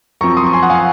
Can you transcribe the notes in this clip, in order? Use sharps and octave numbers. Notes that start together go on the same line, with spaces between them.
F#2 F3 C4 A#5 C#6
C6 D#6
C#6
G#5 C6
F#5
F5 G#5